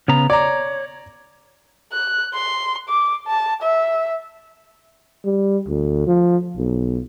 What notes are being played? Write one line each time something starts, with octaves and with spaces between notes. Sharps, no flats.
C#3 B3 A#5
C#5 D5 A#5
F#6
C6
D6
A5
E5
G3
D2
F3
B1